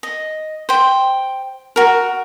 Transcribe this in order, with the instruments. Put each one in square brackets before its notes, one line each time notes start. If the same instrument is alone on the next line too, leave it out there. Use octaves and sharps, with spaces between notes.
[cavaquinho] D#5
C5 G5
F#4 A#4